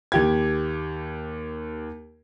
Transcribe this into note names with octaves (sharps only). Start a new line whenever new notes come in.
D#2 G4 G#6